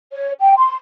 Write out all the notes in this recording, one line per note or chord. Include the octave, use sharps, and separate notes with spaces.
C#5
G5
C6